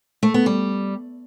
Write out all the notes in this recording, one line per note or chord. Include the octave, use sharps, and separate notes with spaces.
A3
B3
G3